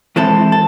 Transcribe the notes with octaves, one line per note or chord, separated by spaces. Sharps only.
E3 G#3 C4 E4 A4
A4